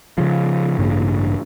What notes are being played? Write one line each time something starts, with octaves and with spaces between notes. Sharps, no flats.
C#3 F3
A1 G2 C#3 A#3